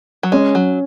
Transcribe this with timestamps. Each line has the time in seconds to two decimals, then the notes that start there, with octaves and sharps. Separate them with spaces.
0.23 F#3
0.32 G#3 C#4
0.55 F#3